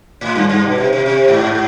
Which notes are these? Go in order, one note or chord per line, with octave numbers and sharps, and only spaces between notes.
A2
G2
G2
B2
C3
C3
C3
G#2